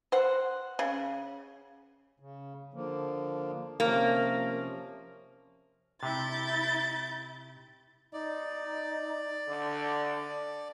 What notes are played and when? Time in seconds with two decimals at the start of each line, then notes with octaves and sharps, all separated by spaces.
0.12 C5 F#5
0.79 C#3
2.20 C#3
2.74 D3 F3 A#3
3.80 C3 F3 A#3 C#4
6.03 C3 E4 G6 A6
8.13 D#4 D5
9.48 D3